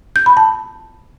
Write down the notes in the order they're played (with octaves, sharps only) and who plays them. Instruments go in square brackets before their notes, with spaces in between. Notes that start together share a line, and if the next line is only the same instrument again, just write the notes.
[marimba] G6
B5
A5